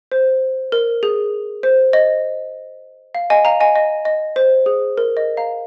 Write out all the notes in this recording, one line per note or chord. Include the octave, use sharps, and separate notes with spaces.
C5
A#4
G#4
C5
D#5
F5
D#5 G#5
F5 A#5
D#5 G#5
D#5
D#5
C5
G#4
A#4
D#5
F5 A#5